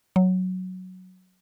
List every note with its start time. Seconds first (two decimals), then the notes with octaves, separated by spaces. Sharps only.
0.16 F#3